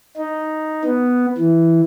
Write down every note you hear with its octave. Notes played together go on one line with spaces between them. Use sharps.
D#4
B3
E3